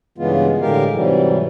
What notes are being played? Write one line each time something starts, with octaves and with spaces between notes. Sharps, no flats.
G2 C#3 E3 G#3 B3 F4
A2 D3 G#3 G4 A#4 F5
G#2 C3 E3 F#3 G3